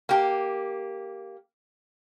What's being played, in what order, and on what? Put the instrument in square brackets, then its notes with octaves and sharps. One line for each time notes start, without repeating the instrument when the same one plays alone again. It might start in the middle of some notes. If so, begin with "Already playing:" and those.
[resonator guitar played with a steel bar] A#3 G4